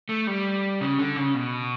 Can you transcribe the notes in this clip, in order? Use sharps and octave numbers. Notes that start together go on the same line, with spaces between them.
A3
G3
C#3
D3
C#3
B2